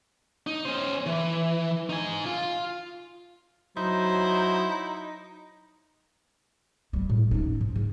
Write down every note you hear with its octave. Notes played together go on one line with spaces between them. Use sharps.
D#4
C#4 C5
E3
D#4 G#5
F4
F#3 D#4 E4 C5
G3 A3
A2
C#4 D#4
G#2
C#3